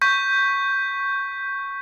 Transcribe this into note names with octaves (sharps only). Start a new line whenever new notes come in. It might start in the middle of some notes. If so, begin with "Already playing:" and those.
C#6 G6 B6